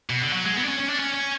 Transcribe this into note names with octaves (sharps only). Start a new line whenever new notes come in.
B2
D3
F#3
G#3
B3
D4
C#4
C#4
D4
C#4
C#4